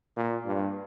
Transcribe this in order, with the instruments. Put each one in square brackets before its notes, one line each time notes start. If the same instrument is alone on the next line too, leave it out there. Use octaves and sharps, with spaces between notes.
[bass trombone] A#2
G2